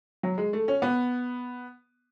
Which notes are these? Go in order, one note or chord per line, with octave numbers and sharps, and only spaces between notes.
F#3
G#3
A3
C#4
B3